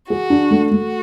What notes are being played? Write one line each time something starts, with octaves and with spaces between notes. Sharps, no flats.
F#4 G#4
D4
A3
A3 F#4